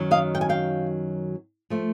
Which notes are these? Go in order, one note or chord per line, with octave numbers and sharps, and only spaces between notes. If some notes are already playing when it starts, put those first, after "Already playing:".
Already playing: F#2 D#3 F#3
D#5 F5
G5
G#5
F5 G5
F3 A3